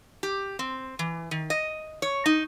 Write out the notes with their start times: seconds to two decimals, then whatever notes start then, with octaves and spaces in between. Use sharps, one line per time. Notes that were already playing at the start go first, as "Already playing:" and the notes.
0.23 G4
0.59 C4
0.99 E3
1.31 D#3
1.50 D#5
2.02 C#5
2.26 D#4